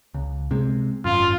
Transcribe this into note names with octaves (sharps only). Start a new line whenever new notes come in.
C#2
C3 G#3
G#1 F#2 F4